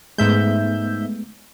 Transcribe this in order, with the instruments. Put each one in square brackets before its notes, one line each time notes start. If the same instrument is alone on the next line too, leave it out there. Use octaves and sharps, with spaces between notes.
[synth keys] G#2 E5 G6 [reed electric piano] G#3 A3 B3